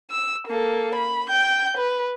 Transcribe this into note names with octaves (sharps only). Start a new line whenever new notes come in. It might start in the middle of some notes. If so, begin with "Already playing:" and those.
E6
A#3 A4
B5
G5 G6
B4